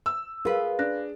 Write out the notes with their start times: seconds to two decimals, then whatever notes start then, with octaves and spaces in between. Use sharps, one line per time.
0.06 E6
0.45 F4 G#4 A#4 B4 F5
0.79 D4 F#6 A#6